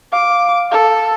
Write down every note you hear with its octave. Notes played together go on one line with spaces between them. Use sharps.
F5 D6
A4